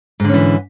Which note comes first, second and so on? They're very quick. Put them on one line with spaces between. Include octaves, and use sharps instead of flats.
G#2 D3 C#4 E3